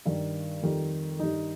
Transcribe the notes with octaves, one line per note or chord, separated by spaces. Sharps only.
G2 D#3 G3
F2 D#3 G3
G2 D#3 G3 D#4